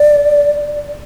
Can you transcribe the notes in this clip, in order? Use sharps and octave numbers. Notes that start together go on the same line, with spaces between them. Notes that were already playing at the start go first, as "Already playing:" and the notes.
Already playing: D5